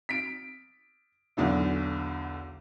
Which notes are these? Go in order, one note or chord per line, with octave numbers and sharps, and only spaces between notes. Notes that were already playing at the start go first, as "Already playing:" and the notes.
B6 D7
B1 E2 D3 F#3